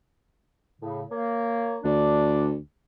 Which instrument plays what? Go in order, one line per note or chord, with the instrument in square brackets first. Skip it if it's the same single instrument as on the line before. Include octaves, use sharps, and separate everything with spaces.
[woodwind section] A2 C#3
A#3 C#5
[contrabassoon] D2 [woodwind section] D4 D5